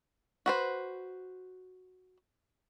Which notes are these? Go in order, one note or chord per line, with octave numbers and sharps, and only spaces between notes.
F#4 B4 C5